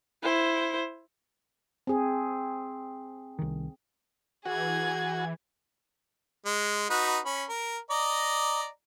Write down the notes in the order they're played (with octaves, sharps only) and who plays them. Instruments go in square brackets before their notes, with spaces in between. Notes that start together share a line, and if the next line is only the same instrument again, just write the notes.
[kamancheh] E4 C5
[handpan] C4 G#4
[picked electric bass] C2 D#3
[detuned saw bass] E3 [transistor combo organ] F#4 [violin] G#4 G#6
[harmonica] G#3
D#4 F#4 B4
C#4 B5
A#4
D5 D#5 A#5